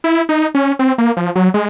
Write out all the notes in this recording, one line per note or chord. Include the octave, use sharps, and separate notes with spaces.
E4
D#4
C#4
C4
A#3
F3
F#3
G#3